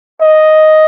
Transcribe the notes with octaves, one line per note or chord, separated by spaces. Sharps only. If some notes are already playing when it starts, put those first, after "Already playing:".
D#5